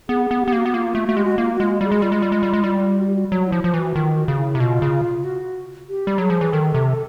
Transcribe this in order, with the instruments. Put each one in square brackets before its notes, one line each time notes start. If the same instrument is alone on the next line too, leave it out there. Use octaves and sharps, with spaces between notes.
[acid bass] B3 [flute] G#4
[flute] G#4
[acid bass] B3
[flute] G4
[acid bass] B3
[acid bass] A#3 [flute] F#4
[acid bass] B3
[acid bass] A#3 [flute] F4
[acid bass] A3
[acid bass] A3 [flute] F#4
[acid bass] G#3 [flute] G4
[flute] F#4
[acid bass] A#3 [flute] F4
[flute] F#4
[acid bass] G#3 [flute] F4
[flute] F#4
[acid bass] G3 [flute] G#4
[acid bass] G#3
[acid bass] G3 [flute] F4
[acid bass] G#3
G3
G#3
G3
G#3
[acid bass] G3 [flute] E4 F4
[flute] F#4
G4
F#4
[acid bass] F#3 [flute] F#4
[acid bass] F3 [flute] E4
[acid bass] F3 [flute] F4
[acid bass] E3
[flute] F#4
[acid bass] D#3 [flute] F4
[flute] F#4
[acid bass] C#3
[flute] E4
[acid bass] C3
[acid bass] B2 [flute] F4
[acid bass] C#3
[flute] F#4
G4
[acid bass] G3
[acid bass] F#3 [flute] G#4
[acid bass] F3
E3
[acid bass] D#3 [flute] A4
[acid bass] C3